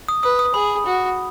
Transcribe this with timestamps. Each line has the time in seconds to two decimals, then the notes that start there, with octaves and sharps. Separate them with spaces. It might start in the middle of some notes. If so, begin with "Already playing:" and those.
0.08 D#6
0.23 B4 D#6
0.39 D#6
0.54 G#4 B5
0.85 F#4